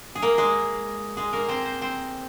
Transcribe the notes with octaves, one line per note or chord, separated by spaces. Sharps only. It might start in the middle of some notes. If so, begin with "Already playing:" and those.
G#4
A#3 A#4
G#3 G#4
G#3 G#4
A#3 A#4
C4 C5
C5
C4 C5